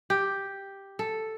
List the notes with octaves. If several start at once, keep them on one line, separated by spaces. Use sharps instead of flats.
G4
A4